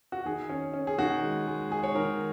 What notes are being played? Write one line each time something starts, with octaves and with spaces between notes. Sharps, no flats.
F#4
D#3 G#4
C#4
C#4
G#4
D#3 F#4
G#3
G#3
G#3 G#4
C#5
D#3 A#4